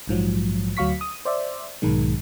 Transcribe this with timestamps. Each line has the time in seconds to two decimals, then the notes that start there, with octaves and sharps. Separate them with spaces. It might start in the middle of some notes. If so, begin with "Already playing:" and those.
0.08 A#1 G#2 F3 F#3
0.77 D2 F#3 F5 C#6 B6
1.01 D#6
1.25 C5 D5 E5
1.82 B1 G#2 D#3 G#3